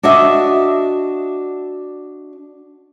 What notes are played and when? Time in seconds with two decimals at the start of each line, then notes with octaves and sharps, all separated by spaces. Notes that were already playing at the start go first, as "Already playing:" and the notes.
0.03 D4 F#4 D#5 E5